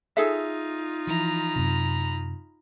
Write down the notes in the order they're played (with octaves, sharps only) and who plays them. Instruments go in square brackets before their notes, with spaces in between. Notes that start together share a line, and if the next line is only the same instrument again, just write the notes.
[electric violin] D#4 F4 [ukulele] G#4 A4 E5
[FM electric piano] E3 F3 E4 [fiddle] A#5 B5
[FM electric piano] F#2 C3